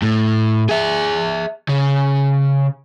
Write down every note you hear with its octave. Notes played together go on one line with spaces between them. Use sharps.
A2
G#4 E5
C#3